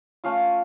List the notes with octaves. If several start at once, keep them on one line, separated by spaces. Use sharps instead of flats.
A3 C#4 F4 F5